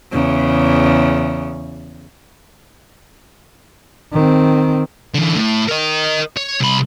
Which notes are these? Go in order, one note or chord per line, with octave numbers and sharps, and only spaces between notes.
E2 C#3
D#3 C4
D3 E3
A2
A#4 D#5
C#5
C2 B5